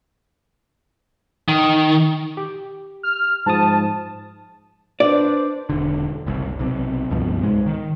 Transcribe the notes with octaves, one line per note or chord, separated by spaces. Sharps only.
D#3
G4
F6
G#2 F3 A5 D#6
D4 B4 C5 D5
E1 D3
F#1 C2
B1 C3
C#2 G2 B2 F3
C2 G#2 G#3
D#3